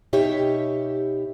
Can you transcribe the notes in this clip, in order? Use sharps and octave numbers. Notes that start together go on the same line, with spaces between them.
B2 D#4 G4 C#5 E5